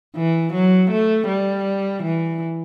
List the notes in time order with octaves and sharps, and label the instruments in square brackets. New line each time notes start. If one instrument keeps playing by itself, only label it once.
[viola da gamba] E3
F#3
A3
G3
E3